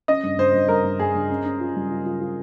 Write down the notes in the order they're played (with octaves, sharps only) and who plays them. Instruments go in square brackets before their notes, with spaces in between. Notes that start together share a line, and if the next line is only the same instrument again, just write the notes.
[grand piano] C#4 [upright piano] D#5
[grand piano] G2
[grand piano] G2 [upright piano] C5
[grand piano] G2
[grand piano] G2 [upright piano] A#4
[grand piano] G2
[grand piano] G2 [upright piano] G#4
[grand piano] G2
C#4
C#4
F4
G3
F4
F4
F4